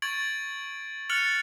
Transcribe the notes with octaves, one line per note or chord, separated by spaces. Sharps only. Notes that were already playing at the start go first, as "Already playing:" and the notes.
C#6 G#6 A6 D7 F#7
F6 F#6 A6 C#7 F7 F#7